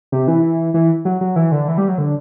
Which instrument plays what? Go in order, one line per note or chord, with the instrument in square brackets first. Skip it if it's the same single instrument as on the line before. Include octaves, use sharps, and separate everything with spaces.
[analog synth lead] C3
E3
E3
F#3
F#3
E3
D3
E3
G3
F#3
D3